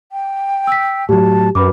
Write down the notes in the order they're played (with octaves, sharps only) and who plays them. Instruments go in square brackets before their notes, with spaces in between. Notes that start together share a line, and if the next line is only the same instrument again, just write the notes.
[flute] G5
[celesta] E6 B6
[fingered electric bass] A2 F#3 [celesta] G4 [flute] A5
[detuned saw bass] F#2 [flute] A#4 [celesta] B4 B5 D6